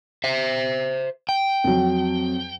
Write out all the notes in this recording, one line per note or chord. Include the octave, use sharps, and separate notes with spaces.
C5 E5
G5
F2 F#3